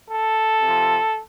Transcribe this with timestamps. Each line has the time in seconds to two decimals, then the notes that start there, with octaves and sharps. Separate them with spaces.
0.09 A4
0.62 C3 F3